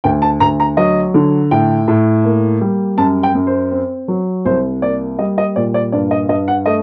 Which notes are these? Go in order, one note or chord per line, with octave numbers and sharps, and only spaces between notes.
D2 G5
A5
D2 A#5
A#5
F#3 D#5
D3
A2 G5
A2
A#3
G3
F#2 A5
G5
F#2
C5
C4
F#3
C2 C5
A#3 D5
G3 D#5
D#5
A#2 D5
D5
G2 D5
D#5
G2 D#5
F#5
A3 D#5